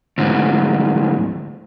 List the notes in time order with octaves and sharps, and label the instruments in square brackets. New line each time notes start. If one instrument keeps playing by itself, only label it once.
[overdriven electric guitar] D2 G#2